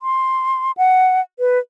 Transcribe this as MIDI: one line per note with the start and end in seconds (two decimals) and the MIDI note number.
0.01 0.72 84
0.77 1.21 78
1.39 1.59 71